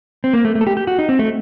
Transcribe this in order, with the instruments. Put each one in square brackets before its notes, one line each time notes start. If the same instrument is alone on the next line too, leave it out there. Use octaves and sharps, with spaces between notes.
[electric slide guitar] C4
A#3
A3
A3
A4
G4
G4
F#4
D#4
C4
A3